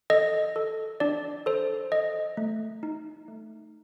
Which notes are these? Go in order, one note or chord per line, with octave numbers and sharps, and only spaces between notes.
A4 D#5
A4
D4 D5
A4 C5
A4 D#5
A3
D#4
A3